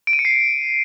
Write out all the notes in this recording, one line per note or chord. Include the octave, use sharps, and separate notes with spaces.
D7
D#7
C#7
C7